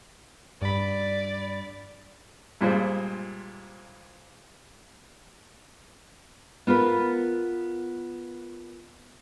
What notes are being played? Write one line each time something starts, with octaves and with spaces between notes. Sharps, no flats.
G2 D5 B5
G2 A#2 G#3 C5
B3 F4 A#4 B4